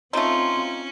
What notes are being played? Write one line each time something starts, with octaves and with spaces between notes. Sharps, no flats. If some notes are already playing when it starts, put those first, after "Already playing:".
A3 C4 C#4 D#4 F4 C6